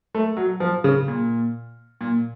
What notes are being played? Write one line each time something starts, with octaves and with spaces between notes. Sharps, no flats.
A3
F#3
F3
C#3
A#2
A#2